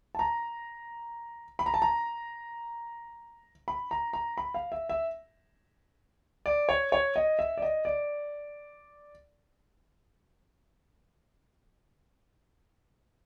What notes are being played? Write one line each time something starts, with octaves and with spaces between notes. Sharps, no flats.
A5
A#5
B5
A#5
A5
A#5
B5
A#5
A#5
B5
F5
E5
E5
D5
C#5
C#5
D#5
E5
D5
D#5
D5